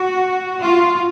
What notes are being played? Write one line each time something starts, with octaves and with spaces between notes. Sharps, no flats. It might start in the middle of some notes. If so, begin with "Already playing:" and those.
Already playing: F#4
F4